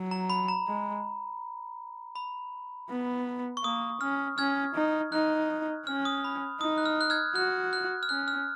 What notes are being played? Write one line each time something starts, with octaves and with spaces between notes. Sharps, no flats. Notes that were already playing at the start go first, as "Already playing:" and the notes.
Already playing: F#3
A#5
B5
A#5
G#3
B5
B3
C#6
A#3 D#6
C#4 F6
C#4 F6 G#6
D#4
D#4 F#6
C#4 F6
D#6
B5
D#4 D#6
F#6
F6
F#6
F6 G#6
F#4 F#6
F#6
F6
C#4 F#6
F6